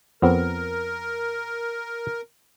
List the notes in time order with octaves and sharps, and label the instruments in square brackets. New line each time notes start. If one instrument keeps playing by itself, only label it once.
[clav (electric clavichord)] F2 B3 C4 [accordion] A#4